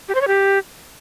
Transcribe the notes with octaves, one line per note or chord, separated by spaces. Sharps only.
G4
C5
C#5
G4